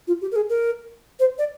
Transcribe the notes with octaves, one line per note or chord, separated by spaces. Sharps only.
F4
G4
A#4
G#4
A#4
C5
D5